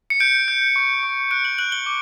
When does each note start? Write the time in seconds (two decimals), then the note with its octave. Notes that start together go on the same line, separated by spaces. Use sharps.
0.10 C#7
0.20 G6 D7
0.48 G6
0.76 C#6
1.03 C#6
1.31 F#6 D7
1.45 F#7
1.59 F#6 F#7
1.72 G7
1.86 D6